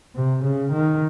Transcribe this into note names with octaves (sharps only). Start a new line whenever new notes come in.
C3
C#3
D#3